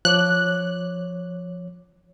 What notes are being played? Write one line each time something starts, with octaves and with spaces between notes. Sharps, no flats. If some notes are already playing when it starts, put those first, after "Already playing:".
F3 C#5 D6 F#6